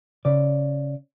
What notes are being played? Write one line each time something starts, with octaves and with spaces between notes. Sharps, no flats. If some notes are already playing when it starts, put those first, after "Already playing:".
C#3 D5